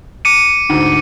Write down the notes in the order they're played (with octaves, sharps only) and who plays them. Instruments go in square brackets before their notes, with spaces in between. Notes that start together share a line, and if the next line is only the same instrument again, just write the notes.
[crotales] D6 C#7 D#7
[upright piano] D2 G#2